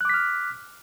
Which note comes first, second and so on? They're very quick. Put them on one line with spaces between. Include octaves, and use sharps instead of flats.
F#6 D6 B6 F6